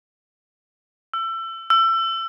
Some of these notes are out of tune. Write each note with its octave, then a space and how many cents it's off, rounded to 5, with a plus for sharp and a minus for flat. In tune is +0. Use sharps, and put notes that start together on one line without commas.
E6 +30
E6 +30